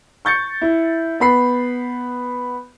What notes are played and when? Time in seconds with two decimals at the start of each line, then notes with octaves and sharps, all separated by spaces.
0.25 C#6 G6 A6 C#7
0.62 E4
1.20 B3 B5 C7